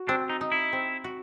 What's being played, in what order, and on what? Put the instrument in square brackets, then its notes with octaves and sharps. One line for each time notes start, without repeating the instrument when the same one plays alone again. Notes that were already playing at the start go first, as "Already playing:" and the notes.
Already playing: [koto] F#4
[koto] C4 [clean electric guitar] D4
[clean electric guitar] D#4
[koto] D#4
[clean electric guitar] E4
[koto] C4
F#4